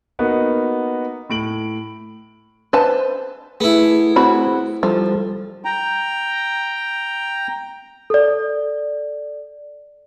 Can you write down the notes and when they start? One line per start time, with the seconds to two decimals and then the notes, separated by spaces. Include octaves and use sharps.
0.19 A#3 B3 D#4 F#4 A#4
1.30 A2 D7 F#7
2.73 B4 C5 A5
3.60 A3 B3 E4 G#4
4.16 C4 F#4 B5
4.83 F3 G3 A4
5.65 G5 A#5
8.10 A4 D5